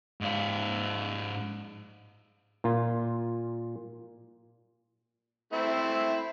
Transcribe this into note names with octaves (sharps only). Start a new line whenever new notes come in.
G#2 F5
A#2 F4
A3 C4 E4